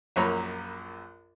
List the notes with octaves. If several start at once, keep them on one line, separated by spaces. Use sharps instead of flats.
A#1 F#2 A#3 C#5 A#5 B5